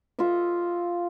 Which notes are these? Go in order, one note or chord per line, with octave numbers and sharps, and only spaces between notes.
F4 A4 D#5 E5